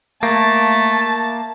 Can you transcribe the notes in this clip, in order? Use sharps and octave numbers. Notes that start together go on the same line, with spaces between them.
A3 A#3 A5